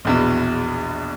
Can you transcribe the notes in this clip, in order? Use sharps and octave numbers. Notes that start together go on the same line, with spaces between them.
A#1 E2 B2